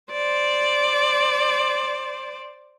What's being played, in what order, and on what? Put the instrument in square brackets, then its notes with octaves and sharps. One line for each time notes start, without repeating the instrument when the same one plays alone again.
[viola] C5 D5